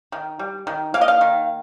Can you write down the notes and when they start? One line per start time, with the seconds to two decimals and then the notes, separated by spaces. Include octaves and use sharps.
0.12 D#3
0.39 G3
0.67 D#3
0.94 A#3 F5
1.01 D#5
1.08 F5
1.21 D#3